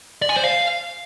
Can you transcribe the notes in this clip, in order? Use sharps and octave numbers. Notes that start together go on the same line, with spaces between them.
D5
G#5
C5
F5